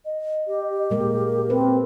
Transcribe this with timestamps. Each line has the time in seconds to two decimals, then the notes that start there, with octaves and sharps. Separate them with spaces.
0.05 D#5
0.47 G4
0.90 A#2 G#3 A#3 A#4
1.50 C4 B4